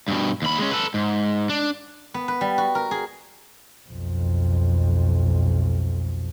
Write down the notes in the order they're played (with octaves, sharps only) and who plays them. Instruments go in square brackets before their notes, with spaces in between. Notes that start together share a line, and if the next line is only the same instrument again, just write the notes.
[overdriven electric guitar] G2 B2
D#2 B5
G#3 C#4
A4 B4
G#2
D4
[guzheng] B3
B4
G3
F#4
A#4
G#4
[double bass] B1 F2